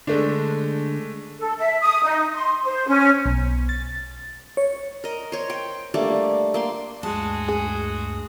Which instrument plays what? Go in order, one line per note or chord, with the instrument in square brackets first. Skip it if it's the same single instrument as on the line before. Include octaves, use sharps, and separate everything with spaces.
[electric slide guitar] D3 [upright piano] G#3 A3 D4
[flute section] A4
E5
D#6
D#4
C6
C5
C#4
[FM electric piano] B1
A6
C#5
[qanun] A#4 D#5
C5 C#5
G5
G3 A3 A#3 D4
A#3 G5 C6
[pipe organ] D2 G2 D#6 [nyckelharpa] G#3 F#4 [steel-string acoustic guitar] A5
[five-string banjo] G#4